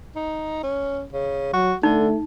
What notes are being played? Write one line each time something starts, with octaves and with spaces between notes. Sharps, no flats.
D#4
C#4
C#3
F#3 F#4
D3 A3 D#4